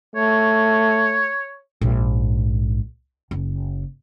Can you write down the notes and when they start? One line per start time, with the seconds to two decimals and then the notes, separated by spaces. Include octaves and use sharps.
0.16 A3 C#5
1.81 A#1 G#2
3.31 F#1